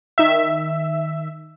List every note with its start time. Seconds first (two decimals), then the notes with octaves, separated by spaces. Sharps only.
0.18 D#3 E5